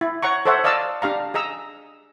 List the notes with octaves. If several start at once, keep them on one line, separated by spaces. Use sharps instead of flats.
E4
C#5 F#5 A#5 C#6
A4 C5 C#5 E5 F#5
D5 D#5 F5 A5 E6
D4 G4 F5 A#5
G#4 D#5 A#5 E6